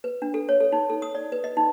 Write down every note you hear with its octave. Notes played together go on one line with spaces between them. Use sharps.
B4
D4
A4
C#5
A4
D#4
A4
D#6
D5
B4
D#5
D#4